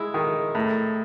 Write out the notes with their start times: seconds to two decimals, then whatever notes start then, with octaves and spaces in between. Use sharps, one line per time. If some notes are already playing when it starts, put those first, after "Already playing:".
Already playing: G#3 E4
0.14 D#3
0.55 A2